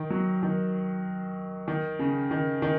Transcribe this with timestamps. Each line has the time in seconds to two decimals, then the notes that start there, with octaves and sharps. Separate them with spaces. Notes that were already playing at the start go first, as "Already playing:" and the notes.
Already playing: D#3
0.10 F#3
0.43 D#3
1.68 D#3
1.99 C#3
2.31 D#3
2.62 D#3